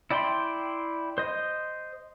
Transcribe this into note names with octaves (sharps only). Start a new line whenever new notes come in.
E4 D5 G5 B5 C6
C5 D#5